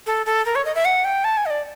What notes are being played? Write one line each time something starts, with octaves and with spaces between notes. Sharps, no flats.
A4
A4
A#4
C#5
D#5
E5
F#5
G5
A5
G#5
D#5
D5